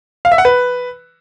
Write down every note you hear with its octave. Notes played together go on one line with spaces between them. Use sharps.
F5
E5
F#5
B4